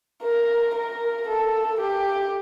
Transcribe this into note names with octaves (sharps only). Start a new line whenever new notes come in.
A#4
A#4
A4
G4